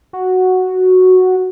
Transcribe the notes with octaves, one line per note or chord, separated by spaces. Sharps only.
F#4